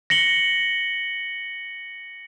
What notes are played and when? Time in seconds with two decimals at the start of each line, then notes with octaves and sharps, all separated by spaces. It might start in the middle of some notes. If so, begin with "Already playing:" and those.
0.10 A#6 C#7 F#7 G7